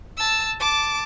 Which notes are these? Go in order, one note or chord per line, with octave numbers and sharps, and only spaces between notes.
A5 E6
A5 D6